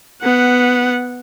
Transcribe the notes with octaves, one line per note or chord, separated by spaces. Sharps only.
B3 F#5